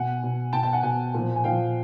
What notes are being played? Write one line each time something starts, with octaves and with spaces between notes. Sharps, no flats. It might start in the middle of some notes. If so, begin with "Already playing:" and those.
Already playing: B2 F#5 G#5
B2
B2 G5 A5
G5 A5
F#5 G#5
B2 F#5 G#5
A#2 F3
G#5
A#2 F3 F5 G5